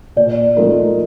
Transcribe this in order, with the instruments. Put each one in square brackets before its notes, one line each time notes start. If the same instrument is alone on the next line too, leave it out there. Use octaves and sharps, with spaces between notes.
[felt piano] A#2 [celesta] D5
[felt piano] F3 A3 D#4 A#4